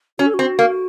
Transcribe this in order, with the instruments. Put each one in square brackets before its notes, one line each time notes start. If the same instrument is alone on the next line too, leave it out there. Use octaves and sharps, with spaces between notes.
[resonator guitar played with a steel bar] C#4 [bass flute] F#4
[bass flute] A4
[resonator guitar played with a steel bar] C4 [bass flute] F#4
[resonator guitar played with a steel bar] A#3